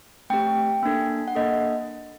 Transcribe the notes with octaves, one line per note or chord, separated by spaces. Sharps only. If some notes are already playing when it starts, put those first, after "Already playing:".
A3 C4 G4 G5
A#3 D4 A4
F#5
A#3 D4 A4 D#5